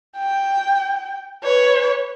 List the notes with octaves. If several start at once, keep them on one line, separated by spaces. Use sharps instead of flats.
G5
B4 C#5